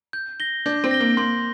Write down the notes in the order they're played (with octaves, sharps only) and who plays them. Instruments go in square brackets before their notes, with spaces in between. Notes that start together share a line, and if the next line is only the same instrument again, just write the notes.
[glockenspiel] G6
A#6 G7
[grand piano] D4 [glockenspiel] G6
[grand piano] C4
[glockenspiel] A#6 G7
[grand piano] A#3
[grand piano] A#3 [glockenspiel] C6